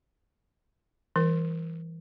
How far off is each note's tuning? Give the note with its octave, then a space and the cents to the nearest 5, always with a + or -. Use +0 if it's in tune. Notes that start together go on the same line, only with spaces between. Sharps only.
E3 +0 G3 +0 A#4 +0